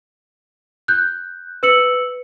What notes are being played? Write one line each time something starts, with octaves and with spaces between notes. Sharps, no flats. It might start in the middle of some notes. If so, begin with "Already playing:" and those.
F#6 G6
B4 E6 C#7 F#7